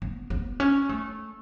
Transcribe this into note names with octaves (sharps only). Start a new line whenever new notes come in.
B3
B3
C#4
A3